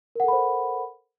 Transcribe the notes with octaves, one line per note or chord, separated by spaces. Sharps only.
A4 A#4 C5 F#5 B5